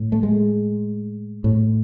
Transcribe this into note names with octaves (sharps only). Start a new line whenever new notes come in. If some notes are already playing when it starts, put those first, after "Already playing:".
Already playing: A2
A3
G#3
A2